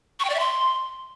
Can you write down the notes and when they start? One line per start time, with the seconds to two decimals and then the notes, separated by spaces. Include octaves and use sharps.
0.20 C#6
0.25 G5
0.30 D5
0.35 E5
0.40 C6